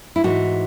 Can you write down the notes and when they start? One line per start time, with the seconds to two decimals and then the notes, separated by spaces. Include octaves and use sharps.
0.16 E4
0.24 G#2 E3 F#4